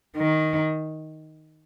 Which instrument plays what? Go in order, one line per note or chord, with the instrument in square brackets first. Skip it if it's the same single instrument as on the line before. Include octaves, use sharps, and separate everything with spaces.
[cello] D#3